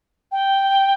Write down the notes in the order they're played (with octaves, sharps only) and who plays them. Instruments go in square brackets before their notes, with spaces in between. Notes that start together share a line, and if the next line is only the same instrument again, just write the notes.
[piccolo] G5